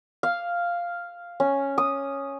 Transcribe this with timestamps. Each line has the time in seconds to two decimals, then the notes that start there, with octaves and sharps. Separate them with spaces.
0.23 F5
1.40 C#4
1.78 D#6